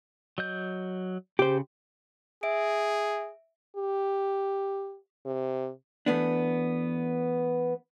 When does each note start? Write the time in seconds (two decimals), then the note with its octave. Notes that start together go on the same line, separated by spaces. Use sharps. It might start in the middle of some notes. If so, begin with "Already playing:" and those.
0.38 F#3 D#5 G6
1.39 C#3 G4 C5
2.43 G#4 E5 D7
3.77 G4
5.26 C3
6.06 E3 A3 B3 D4